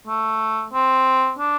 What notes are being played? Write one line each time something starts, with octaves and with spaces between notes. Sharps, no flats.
A3
C4
D4